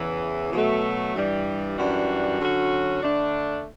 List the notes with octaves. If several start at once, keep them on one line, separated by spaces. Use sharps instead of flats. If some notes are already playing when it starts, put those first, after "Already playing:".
Already playing: E2 C#3 E3
B2 F#3 A3
G2 E3 G3
F#2 E3 G3 D4 F#4
D3 F#3 C#4 F#4
D3 A3 D4